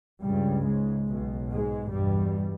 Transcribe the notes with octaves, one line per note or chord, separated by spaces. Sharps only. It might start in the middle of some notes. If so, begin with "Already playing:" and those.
C#2 G2 C#3 G3
G#2 G#3
B1 B2
G#2 G#3
E2 G2 B2 G3